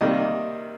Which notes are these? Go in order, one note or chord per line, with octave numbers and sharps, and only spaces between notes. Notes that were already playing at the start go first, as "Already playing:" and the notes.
C3 D#3 G3 A#3 D#5